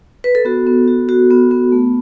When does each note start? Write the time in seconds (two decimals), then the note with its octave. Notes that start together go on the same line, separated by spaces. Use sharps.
0.24 B4
0.35 A4
0.45 B3 F#4
0.67 B3
0.88 F#4
1.09 F#4
1.31 B3
1.51 B3
1.72 A3